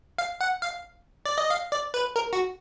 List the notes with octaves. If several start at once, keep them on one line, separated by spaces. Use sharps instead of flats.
F5
F#5
F5
D5
D#5
F5
D5
B4
A#4
F#4